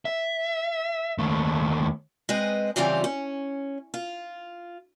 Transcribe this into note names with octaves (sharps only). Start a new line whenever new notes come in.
E5
D#2 A3
G#3 C4 B4 D#5
C#3 E3 F3 G3 C4 F4
C#4
F4